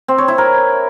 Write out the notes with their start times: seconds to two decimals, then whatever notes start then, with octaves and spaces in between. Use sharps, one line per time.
0.08 C4
0.18 C#5
0.28 E4
0.38 A#4